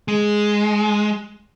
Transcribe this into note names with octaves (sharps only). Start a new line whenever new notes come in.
G#3